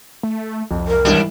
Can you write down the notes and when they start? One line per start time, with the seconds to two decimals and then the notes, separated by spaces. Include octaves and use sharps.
0.23 A3
0.71 C2 F2
0.88 A#4
1.05 D#2 G#2 E3 G3 D4